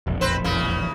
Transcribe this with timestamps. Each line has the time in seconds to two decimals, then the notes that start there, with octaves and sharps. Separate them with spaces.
0.07 E1 A#1 F2
0.21 C4 B4 C5
0.44 E2 C#3 A#3